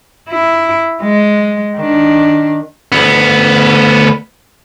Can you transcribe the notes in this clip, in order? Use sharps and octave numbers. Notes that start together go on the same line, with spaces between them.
E4
G#3
D#3 D4
D2 B3